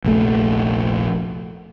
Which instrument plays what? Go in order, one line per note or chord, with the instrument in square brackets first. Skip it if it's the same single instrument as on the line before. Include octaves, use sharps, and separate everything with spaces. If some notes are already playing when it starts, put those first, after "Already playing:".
[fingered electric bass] F1 A#1 A3